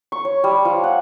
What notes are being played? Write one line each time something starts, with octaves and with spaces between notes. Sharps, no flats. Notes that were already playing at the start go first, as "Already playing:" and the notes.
C#6
C#5
G3
F3
F#5